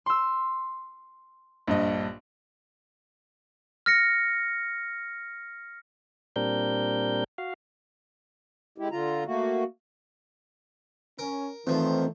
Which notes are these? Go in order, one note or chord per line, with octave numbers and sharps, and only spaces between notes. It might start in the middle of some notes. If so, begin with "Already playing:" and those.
C6 E6
A#1 G2 D#5
F6 A#6 C#7
A#2 G3 C4 D4 A#4 G6
F#4 F5
G#3 E4 G4
D3 F4 A#5
A3 A#3 F#4
C#4 A#4
E2 D#3 F3 A3 C4